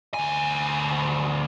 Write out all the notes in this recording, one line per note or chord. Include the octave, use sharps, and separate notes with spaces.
D2 G#5